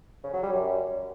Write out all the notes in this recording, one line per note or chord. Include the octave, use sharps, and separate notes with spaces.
C#3
F#3
G3
F#2